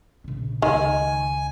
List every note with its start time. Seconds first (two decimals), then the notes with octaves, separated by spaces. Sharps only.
0.24 A#1 C#3
0.62 C#2 D#3 G#5